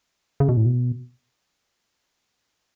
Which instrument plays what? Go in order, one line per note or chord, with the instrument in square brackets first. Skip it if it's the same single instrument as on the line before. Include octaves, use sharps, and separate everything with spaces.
[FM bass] C#3
B2
A2
B2